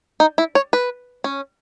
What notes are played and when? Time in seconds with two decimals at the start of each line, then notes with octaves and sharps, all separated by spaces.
0.20 D#4
0.38 E4
0.55 C#5
0.73 B4
1.24 C#4